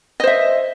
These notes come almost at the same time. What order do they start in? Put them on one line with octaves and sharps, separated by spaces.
D#5 C5 E5